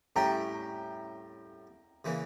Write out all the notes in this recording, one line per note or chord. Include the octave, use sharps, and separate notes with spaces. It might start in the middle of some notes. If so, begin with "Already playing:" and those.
A2 G3 C#4 E4 G5 A#5
C#3 E3 A#3